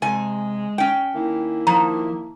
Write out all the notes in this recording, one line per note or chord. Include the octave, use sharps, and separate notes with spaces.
C3 G#3 G#5
C#4 G5
D#3 A#3 E4
F3 A#5